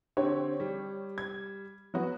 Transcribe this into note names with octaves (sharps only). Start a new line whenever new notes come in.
D3 C4 G4 C#5
G3
G#6
F#3 B3 F#4